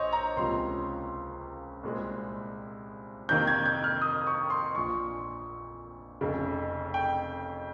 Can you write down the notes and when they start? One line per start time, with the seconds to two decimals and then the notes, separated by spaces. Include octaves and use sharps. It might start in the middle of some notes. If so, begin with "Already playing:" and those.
Already playing: A#1 C5 C#5 D#5
0.13 A#5
0.37 C#2 C3 F3 A#3 C#4 C6
1.83 C2 A#2 G#3 C4
3.29 F2 C3 D#3 A#3 G6
3.47 G#6
3.66 G6
3.84 F6
4.02 D#6
4.27 C#6
4.50 C6
4.75 A#1 A#2 F3 C#6
6.21 F1 F2 C#3
6.94 G5